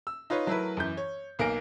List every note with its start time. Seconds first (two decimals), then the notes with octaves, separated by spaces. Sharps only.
0.07 E6
0.30 D#4 F4 B4 C#5
0.47 F#3 A3 E4 A#4 B4
0.77 F#2 E3 G6
0.97 C#5
1.39 B1 A#3 G#5 A#6 D7